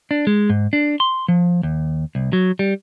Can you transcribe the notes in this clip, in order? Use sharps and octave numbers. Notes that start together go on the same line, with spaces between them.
D4
G#3
G#2
D4
C6
F3
D#2
C2
F#3
G3